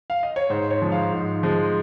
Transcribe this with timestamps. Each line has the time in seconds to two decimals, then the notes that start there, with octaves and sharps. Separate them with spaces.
0.10 F5
0.23 D#5
0.36 C#5
0.50 G#2 C5
0.71 C#5
0.82 F3 G#3
0.92 F5
1.12 G#2
1.43 F3 G#3